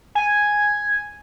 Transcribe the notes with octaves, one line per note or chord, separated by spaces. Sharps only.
G#5